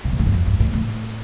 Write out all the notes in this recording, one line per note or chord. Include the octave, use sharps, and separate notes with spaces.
C3
A#2
A2
G2
F2
G2
A2
A2